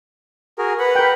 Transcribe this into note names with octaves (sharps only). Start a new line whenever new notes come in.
F#4 G#4 A#4
B4 F#5 B5
A#4 G5